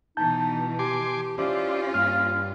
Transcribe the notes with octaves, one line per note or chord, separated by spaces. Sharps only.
B2 E3 D#4 A5 G6
G4 G#5 C6 D6
C#4 E4 F4 G4 C5 D5
G2 A#3 F6